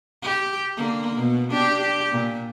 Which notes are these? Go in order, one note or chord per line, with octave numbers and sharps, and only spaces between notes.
G4
D3 A#3
B2
D4 G4
G4
A#2